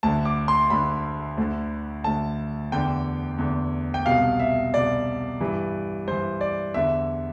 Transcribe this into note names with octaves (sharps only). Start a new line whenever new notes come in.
D2 D3 A5
D6
C6
D2 D3 B5
D2 D3
D2 D3 A5
E2 D3 G5
E2 D3
G5
C2 B2 F5
E5
C2 B2 D5
G2 E3
G2 E3 C5
D5
E2 D3 E5